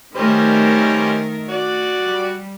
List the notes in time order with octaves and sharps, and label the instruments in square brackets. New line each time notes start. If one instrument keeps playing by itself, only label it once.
[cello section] D#3 A3 A#4 [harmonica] G3 C#4 C5
[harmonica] F#4 D5
[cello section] G3